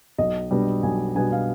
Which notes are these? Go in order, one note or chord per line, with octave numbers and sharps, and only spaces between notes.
B1 D#5
B2 G3 B3 D4
B1 G#5
B2 G3 B3 D4 G#5
F5